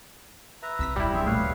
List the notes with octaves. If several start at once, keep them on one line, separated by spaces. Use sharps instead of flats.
B4 E5 A#5
C2 C4 E6 B6
D#1 G3 E4
B1 C4 D4 G#4 E5
A#2 A3 B4 C#5 F5
D2